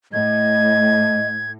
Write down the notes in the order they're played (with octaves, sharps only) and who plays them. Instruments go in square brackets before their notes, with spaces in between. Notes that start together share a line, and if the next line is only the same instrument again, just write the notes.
[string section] A2 [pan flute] D#5 [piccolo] G#6